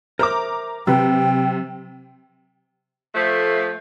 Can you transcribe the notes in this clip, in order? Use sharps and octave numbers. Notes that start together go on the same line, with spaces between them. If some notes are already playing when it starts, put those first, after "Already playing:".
A#4 C5 E5 A#5 D6
C3 F#3 B4 G5
F3 A3